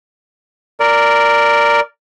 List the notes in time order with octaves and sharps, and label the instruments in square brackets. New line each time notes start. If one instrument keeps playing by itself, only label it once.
[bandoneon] A#4 D5